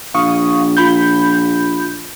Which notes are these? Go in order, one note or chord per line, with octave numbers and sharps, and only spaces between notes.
A#1 F5 C#6 D#6
F4 B5 G6